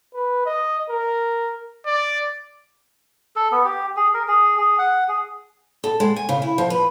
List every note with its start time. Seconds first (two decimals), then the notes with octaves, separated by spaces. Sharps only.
0.14 B4
0.45 D#5
0.90 A#4
1.86 D5
3.36 A4
3.52 B3
3.65 G4
3.97 G#4
4.14 A#4
4.28 G#4
4.58 G#4
4.79 F#5
5.08 G#4
5.84 A4
6.00 G#3
6.16 G#5
6.29 C#3
6.42 E4
6.58 F3
6.70 B4